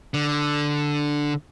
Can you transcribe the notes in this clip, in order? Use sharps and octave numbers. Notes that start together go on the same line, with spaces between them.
D3